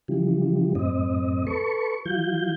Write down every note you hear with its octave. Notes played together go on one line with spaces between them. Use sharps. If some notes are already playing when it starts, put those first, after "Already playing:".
C#3 E3 F3 G3
F#2 A2 C4 D#5
A4 B4 C#6
E3 F#3 F4 G6